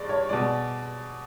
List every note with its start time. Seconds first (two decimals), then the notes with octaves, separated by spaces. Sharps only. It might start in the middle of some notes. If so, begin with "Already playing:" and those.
Already playing: G2 G#3 D5
0.09 C#5
0.29 B2 G#3 D5